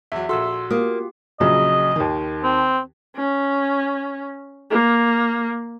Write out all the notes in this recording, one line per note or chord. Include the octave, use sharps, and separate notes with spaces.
E2 F#3 E5
A#1 F#4 A4 C6 E6
A#3 F4 G4 D#6
A#1 C#3 F#3 D#5
D#2 D#3
C4
C#4
A#3